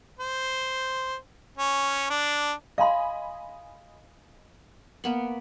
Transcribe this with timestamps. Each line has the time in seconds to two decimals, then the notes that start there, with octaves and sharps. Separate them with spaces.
0.19 C5
1.57 C#4
2.10 D4
2.78 D#5 F5 G#5 B5 C6
5.04 A#3 B3 B5